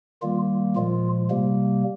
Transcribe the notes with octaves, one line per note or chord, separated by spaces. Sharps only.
D#3 G3 A#3 F4
A#2 F3 G#3 F4
C3 G3 A#3